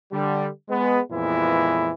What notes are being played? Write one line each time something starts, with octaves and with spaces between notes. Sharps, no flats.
D3 G3
G#3 B3
F2 A#2 E3 G#3 B3 E4